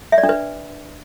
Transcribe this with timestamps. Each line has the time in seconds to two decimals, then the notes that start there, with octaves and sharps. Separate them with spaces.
0.12 E5
0.18 D5
0.23 D4
0.29 B4